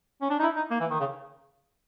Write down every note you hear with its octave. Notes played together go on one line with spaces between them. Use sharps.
C#4
D4
D#4
E4
D#4
A#3
E3
D#3
C#3